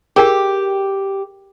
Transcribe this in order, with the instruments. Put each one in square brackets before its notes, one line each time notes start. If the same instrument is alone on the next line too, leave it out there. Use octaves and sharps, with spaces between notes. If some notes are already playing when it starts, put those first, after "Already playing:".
[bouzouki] G4 [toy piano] G#4 A#4 G5